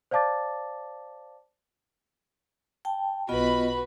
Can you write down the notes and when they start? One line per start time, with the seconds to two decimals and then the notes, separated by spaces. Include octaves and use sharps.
0.11 C5 D5 F5 A5 D6 A6
2.85 G5 A5
3.29 B1 B3 F4 F#4 B4 D#5 B5